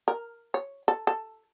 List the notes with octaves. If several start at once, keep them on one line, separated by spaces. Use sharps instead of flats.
A#4
C#5
A4
A4